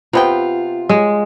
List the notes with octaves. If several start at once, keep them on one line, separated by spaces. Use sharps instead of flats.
C3 B3 F4 G5
G#3